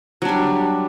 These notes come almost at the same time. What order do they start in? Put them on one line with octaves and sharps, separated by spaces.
F#3 D4 G3